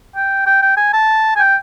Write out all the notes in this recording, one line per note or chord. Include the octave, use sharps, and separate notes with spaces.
G5
G5
G5
G#5
A5
G#5
G5